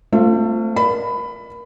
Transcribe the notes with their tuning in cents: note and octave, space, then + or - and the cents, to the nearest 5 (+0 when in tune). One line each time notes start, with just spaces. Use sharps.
A3 +30 C4 +0 F4 +0
A#4 +35 D5 +0 B5 +15